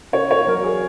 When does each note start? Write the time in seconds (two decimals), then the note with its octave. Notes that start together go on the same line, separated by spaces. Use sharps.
0.12 C#3 C#5
0.31 C#5
0.47 F#3 A#4
0.64 G#4